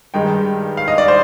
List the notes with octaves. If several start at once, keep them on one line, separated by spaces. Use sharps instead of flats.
G2 D#3 G#3 D#4 G5
F5
D#5
D5
C5